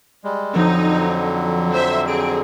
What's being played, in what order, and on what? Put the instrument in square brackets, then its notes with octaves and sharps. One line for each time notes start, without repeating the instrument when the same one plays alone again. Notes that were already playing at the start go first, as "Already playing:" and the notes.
[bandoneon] G3 G#3
[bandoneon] F2 D3 F#3 [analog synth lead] F3 [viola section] D#4
[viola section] C5 E5
[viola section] C4 G#4 [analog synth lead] D7